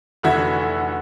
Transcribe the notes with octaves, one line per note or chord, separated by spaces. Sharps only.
F1 D3 E3 F#4 E5 G#6